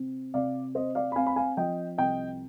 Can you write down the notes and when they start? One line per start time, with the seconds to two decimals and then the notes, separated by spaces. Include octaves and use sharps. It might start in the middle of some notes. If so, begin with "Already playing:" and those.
Already playing: C3 C4
0.34 C3 D5 F5
0.75 C4 C5 D#5
0.95 D5 F5
1.12 B5
1.16 C4 F5 G#5
1.26 B5
1.36 F5 G#5
1.57 F3 D#5 G5
1.98 C2 D#5 G5